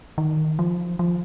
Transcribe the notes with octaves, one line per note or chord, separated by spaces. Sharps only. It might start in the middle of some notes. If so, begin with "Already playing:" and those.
D#3
F3
F3